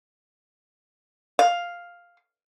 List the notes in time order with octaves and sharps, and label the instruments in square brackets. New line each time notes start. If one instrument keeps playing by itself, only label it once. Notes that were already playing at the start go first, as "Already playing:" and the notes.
[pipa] F5